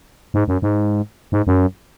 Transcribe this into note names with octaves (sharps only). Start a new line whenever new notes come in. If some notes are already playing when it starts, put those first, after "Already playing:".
G#2
F#2
G#2
G#2
F#2